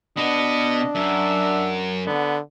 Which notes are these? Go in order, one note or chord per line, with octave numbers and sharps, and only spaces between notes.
B2 B3 D4 D#5
F#2 E5
D3 B3